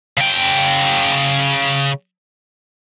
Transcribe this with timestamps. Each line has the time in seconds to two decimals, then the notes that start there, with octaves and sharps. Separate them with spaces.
0.17 C#3 G5